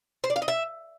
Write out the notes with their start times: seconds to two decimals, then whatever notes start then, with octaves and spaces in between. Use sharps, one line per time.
0.24 C5
0.30 D5
0.36 F5
0.42 D#5
0.48 E5